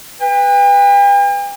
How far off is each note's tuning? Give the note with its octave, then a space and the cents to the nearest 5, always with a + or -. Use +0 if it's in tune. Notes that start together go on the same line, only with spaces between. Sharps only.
B4 +0 G5 +45